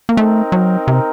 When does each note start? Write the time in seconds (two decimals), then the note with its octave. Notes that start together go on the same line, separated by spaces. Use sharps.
0.09 A#3
0.17 A3 C4 D#4 A#4
0.52 F#3
0.88 C3